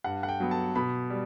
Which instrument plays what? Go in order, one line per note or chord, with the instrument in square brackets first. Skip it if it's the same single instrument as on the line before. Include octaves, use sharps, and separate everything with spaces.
[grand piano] G2 F#5
F#5
G5
F#3 B3
A5
B2 B5
G3